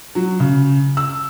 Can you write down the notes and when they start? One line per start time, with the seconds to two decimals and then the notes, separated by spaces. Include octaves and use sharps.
0.15 F#3
0.40 C#3
0.97 E6